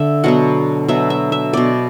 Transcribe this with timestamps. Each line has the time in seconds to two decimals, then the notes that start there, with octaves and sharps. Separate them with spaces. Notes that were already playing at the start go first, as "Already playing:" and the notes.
Already playing: D3 E5
0.24 B2 F#3 B3 F#5
0.88 B2 F#3 B3 E5
1.10 E5
1.32 E5
1.53 B2 B3 D5